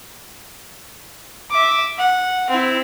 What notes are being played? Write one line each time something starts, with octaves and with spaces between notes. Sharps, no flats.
E5 D6
F#5
C4 E4